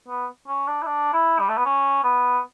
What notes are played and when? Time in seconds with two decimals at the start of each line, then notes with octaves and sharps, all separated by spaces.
0.08 B3
0.48 C#4
0.68 D4
0.82 E4
0.87 D4
1.13 E4
1.40 G3
1.49 A3
1.57 B3
1.65 C#4
2.04 B3